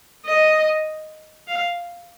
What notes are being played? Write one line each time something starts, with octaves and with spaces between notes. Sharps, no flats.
D#5
F5